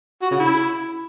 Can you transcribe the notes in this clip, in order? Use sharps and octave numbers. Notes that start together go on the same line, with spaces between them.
F#4
C#3
E4